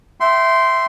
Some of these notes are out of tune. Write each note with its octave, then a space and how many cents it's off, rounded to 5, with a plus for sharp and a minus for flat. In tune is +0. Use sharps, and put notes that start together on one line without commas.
E5 +5 G5 -30 C6 -5